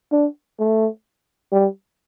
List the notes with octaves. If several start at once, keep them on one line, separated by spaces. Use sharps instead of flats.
D4
A3
G3